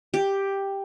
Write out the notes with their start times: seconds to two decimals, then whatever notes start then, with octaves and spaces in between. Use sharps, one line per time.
0.14 G4